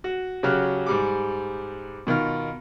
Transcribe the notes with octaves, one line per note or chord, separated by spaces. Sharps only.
F#4
C#3 F#3 F#4 G4 F6 F#6
G#2 G3 D6
B2 D#3 F4 F6